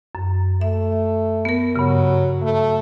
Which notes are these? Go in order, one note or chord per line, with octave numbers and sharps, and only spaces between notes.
F#2
A3 E5
B3 A#4
G2 C#3 F#3
A3